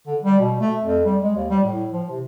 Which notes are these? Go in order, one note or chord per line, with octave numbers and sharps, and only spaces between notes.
D3
G3
B2
A3
F2
G3
G#3
D#2
G3
A2
F3
C3